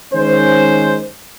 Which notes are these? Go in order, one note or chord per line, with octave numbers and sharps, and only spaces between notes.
D#3 G#3 C#4 C5